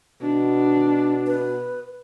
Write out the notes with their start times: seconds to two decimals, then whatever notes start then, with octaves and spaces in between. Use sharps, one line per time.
0.22 B2 D4
1.27 B4